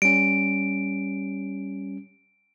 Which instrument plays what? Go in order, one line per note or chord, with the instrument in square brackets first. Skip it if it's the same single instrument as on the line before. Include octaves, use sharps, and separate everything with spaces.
[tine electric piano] G3 C#4 [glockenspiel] D7